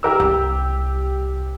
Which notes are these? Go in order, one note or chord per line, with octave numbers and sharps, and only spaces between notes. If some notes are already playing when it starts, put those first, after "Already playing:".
G4 A#4 E6
C2 G4